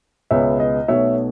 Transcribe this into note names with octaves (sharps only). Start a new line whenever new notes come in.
C#2 B2 G#3 B3 C#5 E5
D#5
B1 B2 A3 C#5 E5